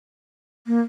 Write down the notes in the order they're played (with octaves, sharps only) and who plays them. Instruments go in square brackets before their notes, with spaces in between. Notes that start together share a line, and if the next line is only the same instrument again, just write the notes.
[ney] A#3